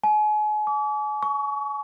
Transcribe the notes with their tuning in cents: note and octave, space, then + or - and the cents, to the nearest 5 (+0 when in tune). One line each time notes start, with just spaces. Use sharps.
G#5 +35
D6 -40
C#6 +25